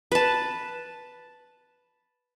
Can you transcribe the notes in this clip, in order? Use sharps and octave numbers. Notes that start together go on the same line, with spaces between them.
B4 A5